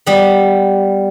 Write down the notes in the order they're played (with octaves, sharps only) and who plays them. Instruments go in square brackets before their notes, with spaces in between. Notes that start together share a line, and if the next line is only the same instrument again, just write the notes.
[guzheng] G3 B3